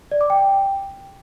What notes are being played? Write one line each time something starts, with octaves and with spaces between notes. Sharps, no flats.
D5
D6
G5